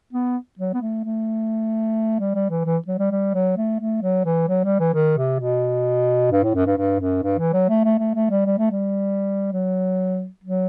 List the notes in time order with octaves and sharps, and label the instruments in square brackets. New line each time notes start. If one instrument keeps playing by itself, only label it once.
[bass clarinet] B3
F#3
B3
A3
A3
G3
G3
E3
E3
F#3
G3
G3
F#3
A3
A3
F#3
E3
F#3
G3
E3
D#3
C3
B2
G2
A2
F#2
G2
G2
F#2
G2
E3
F#3
A3
A3
A3
A3
G3
G3
A3
G3
F#3
F#3